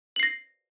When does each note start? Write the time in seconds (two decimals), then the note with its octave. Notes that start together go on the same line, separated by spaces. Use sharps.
0.16 F#7
0.20 C7
0.23 A#6